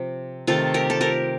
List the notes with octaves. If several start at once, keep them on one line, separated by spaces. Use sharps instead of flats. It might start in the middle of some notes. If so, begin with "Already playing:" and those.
Already playing: C3 F3
C3 D#3 A3 F4 A4
G4 A#4
A4
G4 A#4